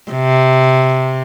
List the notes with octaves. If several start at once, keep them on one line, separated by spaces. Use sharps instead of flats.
C3